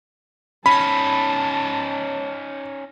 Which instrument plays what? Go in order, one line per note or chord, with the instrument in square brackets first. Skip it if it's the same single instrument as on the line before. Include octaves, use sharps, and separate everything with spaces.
[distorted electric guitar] C#4 D#4 [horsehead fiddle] A5 [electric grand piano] B5